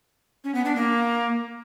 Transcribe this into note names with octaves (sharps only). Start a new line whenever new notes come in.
C#4
B3
D4
A#3